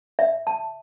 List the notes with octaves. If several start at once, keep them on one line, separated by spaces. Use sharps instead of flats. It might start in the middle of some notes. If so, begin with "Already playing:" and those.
E5
A5